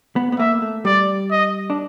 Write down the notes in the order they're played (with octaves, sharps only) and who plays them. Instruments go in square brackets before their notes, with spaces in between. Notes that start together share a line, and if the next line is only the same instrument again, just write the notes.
[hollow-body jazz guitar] B3
B3
[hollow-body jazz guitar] A#3 [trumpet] E5
[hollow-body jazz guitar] A3
[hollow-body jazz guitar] G3 [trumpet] D5
[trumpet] D#5
[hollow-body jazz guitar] D4